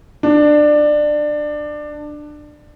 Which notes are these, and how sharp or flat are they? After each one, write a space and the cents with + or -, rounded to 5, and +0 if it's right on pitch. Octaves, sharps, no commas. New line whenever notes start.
D4 +20